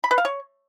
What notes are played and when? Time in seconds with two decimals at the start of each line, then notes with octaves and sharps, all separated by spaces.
0.04 B5
0.11 B4
0.18 F5
0.25 C#5